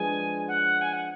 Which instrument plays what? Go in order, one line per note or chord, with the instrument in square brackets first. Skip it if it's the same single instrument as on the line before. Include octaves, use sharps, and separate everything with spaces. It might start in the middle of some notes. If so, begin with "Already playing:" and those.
Already playing: [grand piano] F3 G#3 D4 G#4 B4 [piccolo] G#5
[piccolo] F#5
G#5
F#5